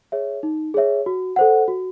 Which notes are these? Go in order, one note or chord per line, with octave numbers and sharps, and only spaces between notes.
G#4 C#5 E5
D#4
G#4 C#5 E5
F#4
A4 C5 F#5
F#4